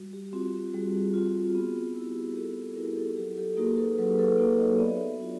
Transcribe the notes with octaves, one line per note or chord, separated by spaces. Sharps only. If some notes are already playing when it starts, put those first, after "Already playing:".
Already playing: G3 F#4
G4
C4 F4 F#4
G4
G3 F#4 G#4
C4 F4
B3
E4
F#4
G4
G#4
B3 G4 A4
E4 G#4 A#4
G4 A4
F#3 G4 A4
G4 A4
A#3 D#4 F#4 G#4 A#4
A4 B4
F#3 A4 B4
A4 B4
A#3 D#4 F#4
C#5 D#5
B3 D5 E5
D4 F4